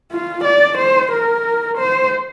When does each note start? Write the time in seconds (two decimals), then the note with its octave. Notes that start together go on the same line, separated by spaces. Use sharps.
0.12 F4
0.45 D5
0.78 C5
1.12 A#4
1.78 C5